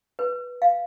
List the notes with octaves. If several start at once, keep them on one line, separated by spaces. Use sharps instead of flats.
B4
F5